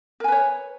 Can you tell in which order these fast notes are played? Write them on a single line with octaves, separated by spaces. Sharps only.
A#4 G#5 B4 C#5